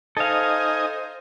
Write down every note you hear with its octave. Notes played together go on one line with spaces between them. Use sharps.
D#4 A4 C5 D#5 F5 G#5